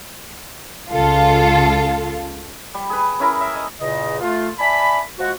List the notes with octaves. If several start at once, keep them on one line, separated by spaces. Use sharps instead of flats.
C#2 F4 A4
G3
G#4 B4
C#4 E4 A#4
E5
D#5
E2 A#2 C#3 D#5
A3 F4
D5 E5 G#5 A5 B5
F3 G#3 F#4